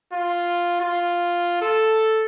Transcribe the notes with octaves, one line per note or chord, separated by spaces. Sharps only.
F4
F4
A4